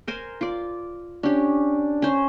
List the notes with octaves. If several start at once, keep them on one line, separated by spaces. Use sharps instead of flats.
A#4 C5 G#5
F4 D5
C#4 D4 G4
C#4 C5